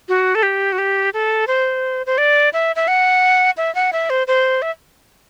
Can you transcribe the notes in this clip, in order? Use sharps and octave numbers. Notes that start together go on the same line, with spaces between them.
F#4
A4
G4
F#4
G4
A4
C5
C5
D5
E5
E5
F#5
E5
F#5
E5
C5
C5
E5